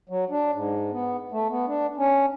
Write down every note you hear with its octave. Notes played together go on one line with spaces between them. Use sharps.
F#3
D4
G#2
B3
A3
B3
D4
C#4